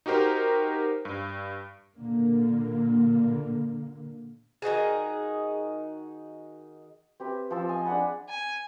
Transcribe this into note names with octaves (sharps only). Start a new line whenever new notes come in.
D#4 F#4 G4 A#4 C5
G2
A#2 D3 A#3
D#3 D#4 F#4 G#4
C4 G4 B4 E5
F3 C4 A5 E6
D#5 F5 G#5 A5
D4 G#4 F#5 B5
G#5